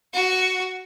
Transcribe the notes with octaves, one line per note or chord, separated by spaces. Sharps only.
F#4